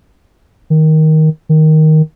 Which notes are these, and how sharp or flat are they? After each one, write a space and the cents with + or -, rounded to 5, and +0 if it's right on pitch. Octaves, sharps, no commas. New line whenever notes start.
D#3 +10
D#3 +5